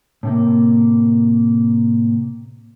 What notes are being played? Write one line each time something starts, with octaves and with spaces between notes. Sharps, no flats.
A2 C3 A#3